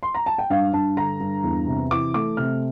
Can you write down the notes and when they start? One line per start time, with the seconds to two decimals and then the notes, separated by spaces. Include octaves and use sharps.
0.03 C6
0.15 A#5
0.26 A5
0.38 G5
0.50 G2 F5
0.73 G2 A5
0.97 D3 A#5
1.20 G2
1.44 E2
1.67 C3
1.91 E3 D6
2.14 A3 D6
2.37 C3 F6